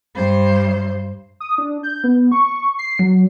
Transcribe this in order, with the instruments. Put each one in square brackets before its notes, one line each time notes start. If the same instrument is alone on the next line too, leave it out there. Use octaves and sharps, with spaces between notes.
[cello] G2 C5
[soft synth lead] D#6
D4
G6
B3
C#6
C7
F#3